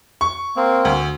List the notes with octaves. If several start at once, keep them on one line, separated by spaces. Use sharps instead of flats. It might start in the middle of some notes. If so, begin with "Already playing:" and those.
C#6
A#3 C4
D2